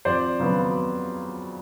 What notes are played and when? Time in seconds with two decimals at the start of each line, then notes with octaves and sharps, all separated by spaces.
0.05 F2 C5 D5
0.40 C#3 F#3 B3